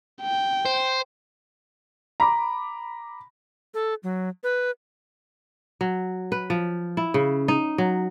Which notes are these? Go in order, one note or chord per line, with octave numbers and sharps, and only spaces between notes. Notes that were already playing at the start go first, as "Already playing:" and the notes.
G5
C5
A#5 B5 D6
A4
F#3
B4
F#3
B4
F3
E4
C#3
D#4
F#3